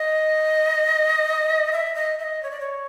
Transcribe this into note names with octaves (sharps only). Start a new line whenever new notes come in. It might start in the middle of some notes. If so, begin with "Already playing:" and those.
Already playing: D#5
E5
D#5
E5
D#5
C#5
D5
C#5